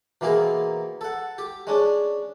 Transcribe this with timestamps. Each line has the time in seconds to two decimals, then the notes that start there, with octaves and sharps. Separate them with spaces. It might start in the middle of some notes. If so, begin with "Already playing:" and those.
0.21 B2 E3 A#3 C4 G#4 A#4
1.01 A4 F#5
1.38 G4
1.67 G#3 C#4 D4